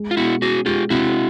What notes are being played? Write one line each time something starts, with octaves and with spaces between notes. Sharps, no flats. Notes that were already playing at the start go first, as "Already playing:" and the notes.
Already playing: G#3
F4
B2 E4 F#4
C#4 F#4 G#4
G#3 F4 G4
C3 E4 F#4